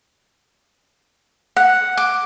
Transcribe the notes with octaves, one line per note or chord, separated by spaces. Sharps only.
F#5
D6